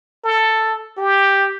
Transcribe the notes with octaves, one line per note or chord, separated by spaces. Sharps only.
A4
G4